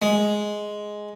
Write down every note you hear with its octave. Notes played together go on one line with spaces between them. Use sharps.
G#3